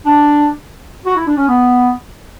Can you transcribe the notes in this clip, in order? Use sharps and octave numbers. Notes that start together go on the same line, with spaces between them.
D4
F#4
E4
D4
C#4
B3